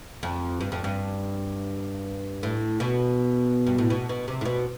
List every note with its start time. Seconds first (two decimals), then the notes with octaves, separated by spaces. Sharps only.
0.23 F2
0.61 G2
0.72 F2
0.84 G2
2.43 A2
2.80 B2
3.67 G2
3.78 A2
3.90 B2
4.09 B2
4.28 C3
4.41 A2
4.45 B2